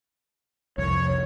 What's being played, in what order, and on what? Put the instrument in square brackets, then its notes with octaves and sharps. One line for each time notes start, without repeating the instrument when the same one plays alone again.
[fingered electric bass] C2 F2 [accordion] C#5